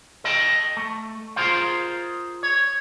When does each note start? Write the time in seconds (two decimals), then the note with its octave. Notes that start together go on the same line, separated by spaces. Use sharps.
0.24 A4 D#5 G5 A5
0.77 A3
1.36 F4 G#4 A#4 C5 F5
2.43 C#5